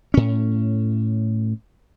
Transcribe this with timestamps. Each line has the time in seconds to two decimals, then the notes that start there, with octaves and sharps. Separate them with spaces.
0.14 A2 C#4